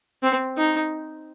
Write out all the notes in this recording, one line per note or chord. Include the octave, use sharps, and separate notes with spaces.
C4
D#4